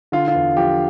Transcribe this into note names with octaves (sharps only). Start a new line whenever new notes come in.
D3 F4
F4
E2
F3 G4